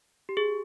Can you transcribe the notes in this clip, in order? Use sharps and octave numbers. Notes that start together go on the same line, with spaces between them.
G4
G#4